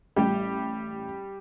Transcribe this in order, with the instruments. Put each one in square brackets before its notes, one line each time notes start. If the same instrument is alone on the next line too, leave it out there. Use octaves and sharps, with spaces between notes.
[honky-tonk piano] A1 [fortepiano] G3 G4